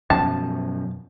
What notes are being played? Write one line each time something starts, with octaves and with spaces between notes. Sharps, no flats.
F#2 B2 F3 A5